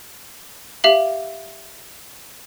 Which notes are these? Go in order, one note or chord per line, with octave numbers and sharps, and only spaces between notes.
G4 E5 F5 F#7